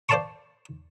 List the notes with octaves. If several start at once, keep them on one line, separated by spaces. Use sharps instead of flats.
C5 D5 F5 A5 C6 C#6